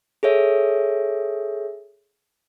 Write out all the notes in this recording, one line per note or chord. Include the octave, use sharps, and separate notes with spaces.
G#4 A4 C#5 E5